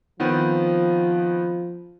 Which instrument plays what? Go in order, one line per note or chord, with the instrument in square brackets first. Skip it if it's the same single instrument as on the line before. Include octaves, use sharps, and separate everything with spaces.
[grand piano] D#3 B3 C4 [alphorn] F3